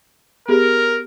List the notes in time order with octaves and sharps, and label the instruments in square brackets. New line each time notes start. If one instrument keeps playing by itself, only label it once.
[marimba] B3 G4 G#4 [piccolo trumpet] A#4